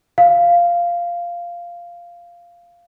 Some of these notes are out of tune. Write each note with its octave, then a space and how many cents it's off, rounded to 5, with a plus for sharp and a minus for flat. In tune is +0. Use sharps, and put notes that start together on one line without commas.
F5 -10